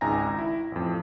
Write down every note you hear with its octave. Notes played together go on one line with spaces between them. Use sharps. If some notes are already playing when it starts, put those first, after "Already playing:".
G#1 C#2 G#2 G#5 A#5 A#6
E4
A1 F2